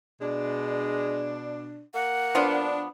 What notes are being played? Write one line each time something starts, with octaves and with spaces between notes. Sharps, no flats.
B2 G#3 D4
A#3 F#5
F3 B3 D4